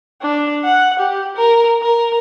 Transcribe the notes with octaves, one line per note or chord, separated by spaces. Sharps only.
D4
F#5
G4
A#4
A#4